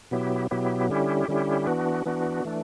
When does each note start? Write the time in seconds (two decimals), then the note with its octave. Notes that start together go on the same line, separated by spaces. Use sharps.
0.11 B2 F#3 B3 E4 G4
0.51 B2 F#3 B3 E4 G4
0.89 D3 G3 C#4 E4 G4
1.28 D3 G3 C#4 E4 G4
1.67 E3 B3 D4 F#4
2.06 E3 B3 D4 F#4
2.45 E3 A3 D4